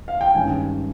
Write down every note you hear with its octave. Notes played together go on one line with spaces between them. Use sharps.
F5
G5
G2 D#3 G#3 C#4 G#5